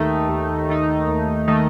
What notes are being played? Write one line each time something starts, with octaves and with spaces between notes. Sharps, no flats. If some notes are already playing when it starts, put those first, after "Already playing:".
Already playing: D#2 D#3 A3 D#4
D#2
D#3 A3 D#4
D#2
D#3 A3 D#4